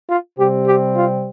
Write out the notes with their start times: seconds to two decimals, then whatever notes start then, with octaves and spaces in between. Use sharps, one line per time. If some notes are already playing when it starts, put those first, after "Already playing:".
0.09 F4
0.38 C3 G3 C4 G4
0.67 G4
0.96 F4